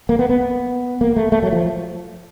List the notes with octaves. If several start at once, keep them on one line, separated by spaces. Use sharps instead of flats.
A#3
B3
B3
A#3
A3
A3
F#3
F3